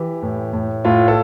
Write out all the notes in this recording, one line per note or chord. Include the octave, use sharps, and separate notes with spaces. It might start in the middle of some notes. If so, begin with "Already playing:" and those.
Already playing: E3 G4
A2
A2
A2 F4
A4